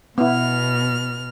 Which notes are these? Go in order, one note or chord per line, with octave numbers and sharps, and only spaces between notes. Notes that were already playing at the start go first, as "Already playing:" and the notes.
B2 B3 E4 F6